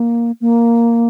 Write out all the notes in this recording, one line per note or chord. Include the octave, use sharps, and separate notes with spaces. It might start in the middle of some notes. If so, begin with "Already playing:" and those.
Already playing: A#3
A#3